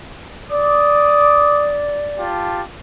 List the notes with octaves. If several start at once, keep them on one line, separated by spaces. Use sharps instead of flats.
D5 D6 D#6
F4 G4 A5